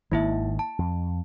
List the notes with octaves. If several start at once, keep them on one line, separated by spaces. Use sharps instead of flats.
G#1 D#3 A#3 E4 E5
A5
F2